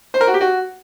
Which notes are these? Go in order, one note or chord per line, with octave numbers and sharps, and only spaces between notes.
C5
A#4
F#4
G4
F#4